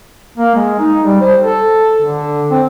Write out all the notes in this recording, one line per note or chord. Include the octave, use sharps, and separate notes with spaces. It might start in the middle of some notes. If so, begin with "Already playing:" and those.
A#3
G#3
D#4
G3
C5
A4
D3
C4